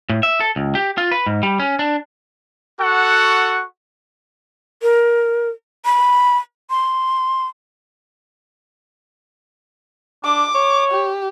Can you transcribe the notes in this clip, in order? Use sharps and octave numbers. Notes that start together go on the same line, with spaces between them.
A2
E5
A4
C#2
G4
F4
B4
G#2
G3
C#4
D4
F#4 A4 F#5 C#6
A#4
B5
C6
D4 D6
C#5
G4